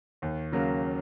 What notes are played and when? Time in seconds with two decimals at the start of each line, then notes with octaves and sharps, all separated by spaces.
0.22 D#2
0.52 C#3 F#3 A#3